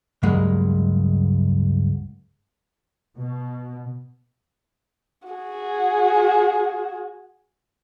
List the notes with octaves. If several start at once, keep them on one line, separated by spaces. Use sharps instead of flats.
C#2 G2 F#3 G#3 A#3
B2
F#4 G#4